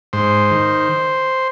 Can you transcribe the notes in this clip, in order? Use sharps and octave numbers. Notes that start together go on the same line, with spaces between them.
G#2 C5
D#3